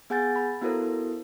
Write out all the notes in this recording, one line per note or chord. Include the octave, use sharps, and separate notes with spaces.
B3 G#4 F#5 G#5 G6 A6
B5
B3 E4 F#4 A4 A#4 C5